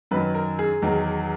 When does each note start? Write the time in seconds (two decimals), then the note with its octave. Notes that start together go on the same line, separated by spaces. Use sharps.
0.11 F#2 D#3 F#3 B4
0.35 A#4
0.59 G#4
0.82 E2 D#3 F#3